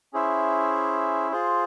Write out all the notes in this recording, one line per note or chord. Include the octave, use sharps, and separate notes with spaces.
C#4 E4 G#4 C5 E5
F4 G#4 C5